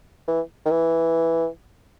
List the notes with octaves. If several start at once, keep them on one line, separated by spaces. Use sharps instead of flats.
E3
D#3
E3